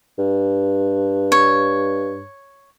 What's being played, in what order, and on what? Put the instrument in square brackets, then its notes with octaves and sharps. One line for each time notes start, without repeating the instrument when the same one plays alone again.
[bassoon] G2
[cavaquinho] C#5